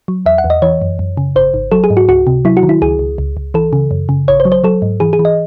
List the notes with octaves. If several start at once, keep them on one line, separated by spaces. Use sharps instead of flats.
F#3
E2 E5
F#5
E2
D#5
E3 C#5
F#2
F#2
C#3
G#1 C5
G#1
F#3 A4
G#4
G#2
F#4
C#2 F#4
C3
F#3 E4
F#4
D#3
E4
C#2 G#4
C#2
C#2
C#2
E3 A4
C#3
F#2
C#3
A1 C#5
C5
F#3
C5
F#3 A4
G#2
E3 G#4
G#4
E3
D#5